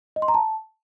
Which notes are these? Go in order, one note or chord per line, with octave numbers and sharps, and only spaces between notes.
D#5
C6
A#5
A5